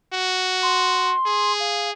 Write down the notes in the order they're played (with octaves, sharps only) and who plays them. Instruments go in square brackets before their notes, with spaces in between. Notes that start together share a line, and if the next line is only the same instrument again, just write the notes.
[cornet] F#4
[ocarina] C6
[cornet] G#4
[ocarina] F5